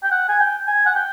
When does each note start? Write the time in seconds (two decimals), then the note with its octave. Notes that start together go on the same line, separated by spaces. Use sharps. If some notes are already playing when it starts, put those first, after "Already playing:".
0.03 G5
0.12 F#5
0.29 G#5
0.40 G5
0.68 G#5
0.86 F#5
0.96 G5